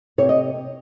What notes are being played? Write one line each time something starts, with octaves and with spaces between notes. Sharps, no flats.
C3 C#5
D#5